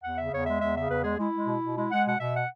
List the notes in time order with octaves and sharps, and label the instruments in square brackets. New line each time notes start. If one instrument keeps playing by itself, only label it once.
[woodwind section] E2 F#5
C#3 E5
E2 C#5
G#3 E5
E2 E5
C#3 E5
E2 B4
G#3 G#4
G#3 E4
G#3
B2
B2
G#3 E4
G#3 F#5
B2 F#5
B2 E5
F#5